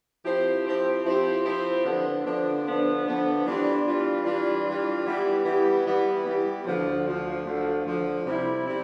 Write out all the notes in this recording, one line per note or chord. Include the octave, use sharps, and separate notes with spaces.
F3 C4 E4 G4 C5
F3 C4 E4 G4 C5
F3 C4 E4 G4 C5
F3 C4 E4 G4 C5
D3 F3 B3 D4
D3 F3 B3 D4
D3 F3 B3 D4
D3 F3 B3 D4
E3 G3 D4 F4
E3 G3 D4 F4
E3 G3 D4 F4
E3 G3 D4 F4
E3 G3 B3 E4 G4
E3 G3 B3 E4 G4
E3 G3 B3 E4 G4
E3 G3 B3 E4 G4
D2 D3 F3
D2 D3 F3
D2 D3 F3
D2 D3 F3
C3 G3 C4 E4
C3 G3 C4 E4